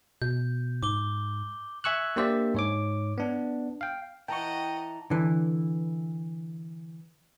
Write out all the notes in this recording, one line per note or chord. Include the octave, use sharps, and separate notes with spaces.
B2 G6
G#2 D6 G7
E5 G#5 C#6 E6 F#6
A#3 D4 G4 C5 D5 E5
G#2 C#5 D6
B3 D4
F5 G5
E3 D#5 F#5 G5 A5 A#5 C#6
D3 E3